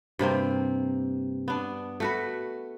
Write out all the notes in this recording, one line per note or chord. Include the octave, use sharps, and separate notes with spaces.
G2 C3 A#3 C4
B3 D4
A3 F#4 B4